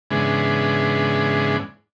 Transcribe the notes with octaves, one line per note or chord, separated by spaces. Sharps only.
G#2 C#3 E3 G#3 B3 D4